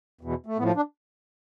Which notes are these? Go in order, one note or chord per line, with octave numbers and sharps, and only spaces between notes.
E2 B2
A3
A2 F3 B3
D4